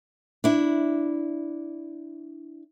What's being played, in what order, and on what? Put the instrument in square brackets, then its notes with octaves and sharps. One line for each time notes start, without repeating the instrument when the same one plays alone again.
[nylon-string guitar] D4 E4